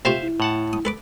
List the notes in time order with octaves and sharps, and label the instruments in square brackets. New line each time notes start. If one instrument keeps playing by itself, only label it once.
[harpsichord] C3 A3 F4 [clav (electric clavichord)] C5 E5 F5
[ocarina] E4
[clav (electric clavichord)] A2 F#5 A5
[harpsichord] D#6
A4 B4 D6